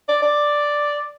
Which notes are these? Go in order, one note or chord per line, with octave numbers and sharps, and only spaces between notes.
D5
D5